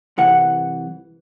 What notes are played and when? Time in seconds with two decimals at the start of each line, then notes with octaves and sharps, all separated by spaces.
0.18 C2 E3 F#5